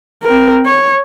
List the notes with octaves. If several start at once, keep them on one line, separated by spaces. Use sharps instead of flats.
C4 A#4
C#5